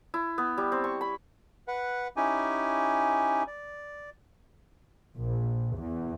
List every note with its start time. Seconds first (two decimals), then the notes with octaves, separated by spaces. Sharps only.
0.14 E4
0.38 B3
0.58 G3
0.72 C4
0.84 C#6
1.01 B5
1.68 B4 F#5
2.17 C#4 D#4 E4 G4 G#5
3.47 D5
5.16 A#1
5.76 E2